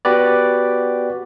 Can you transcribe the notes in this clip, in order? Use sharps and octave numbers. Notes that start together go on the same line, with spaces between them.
B3 F#4 G4 B4 D5